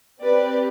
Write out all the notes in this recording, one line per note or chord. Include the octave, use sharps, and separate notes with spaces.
C4 G4 B4 D5